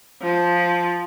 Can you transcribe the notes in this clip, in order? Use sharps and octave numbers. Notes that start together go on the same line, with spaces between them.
F3